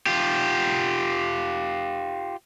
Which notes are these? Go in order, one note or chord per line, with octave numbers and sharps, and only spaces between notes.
F4 G4